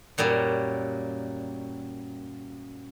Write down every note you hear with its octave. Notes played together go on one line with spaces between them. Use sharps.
F#2 A#2 F#3 G3